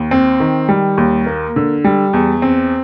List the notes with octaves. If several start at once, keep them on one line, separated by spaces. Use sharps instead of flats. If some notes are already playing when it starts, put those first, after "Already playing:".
Already playing: D#2
C4
D#3
G3
D#2
A#3
D3
G3
E2
C4